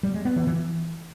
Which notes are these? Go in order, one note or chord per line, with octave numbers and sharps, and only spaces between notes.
G3
G#3
B3
E3
E3